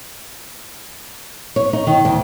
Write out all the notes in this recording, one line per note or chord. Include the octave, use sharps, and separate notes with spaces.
C#5
D#4
D#3
D2